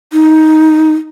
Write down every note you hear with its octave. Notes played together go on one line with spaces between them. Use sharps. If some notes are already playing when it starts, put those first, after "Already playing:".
D#4